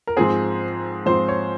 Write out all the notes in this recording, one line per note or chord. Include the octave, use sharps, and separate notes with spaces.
A#4
G#2 F3 C4 G#4
G#2 F3 C4 C5
C#5